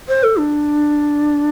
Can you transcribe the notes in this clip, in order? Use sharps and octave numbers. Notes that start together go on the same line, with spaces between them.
C5
A4
D4